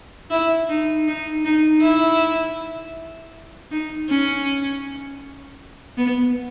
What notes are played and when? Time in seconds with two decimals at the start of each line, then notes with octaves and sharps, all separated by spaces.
0.31 E4
0.69 D#4
1.07 D#4
1.45 D#4
1.82 E4
3.71 D#4
4.09 C#4
5.97 B3